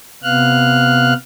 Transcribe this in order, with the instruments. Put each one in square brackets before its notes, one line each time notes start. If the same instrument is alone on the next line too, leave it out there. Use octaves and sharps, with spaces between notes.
[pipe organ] C3 B3 F5 F6 F#6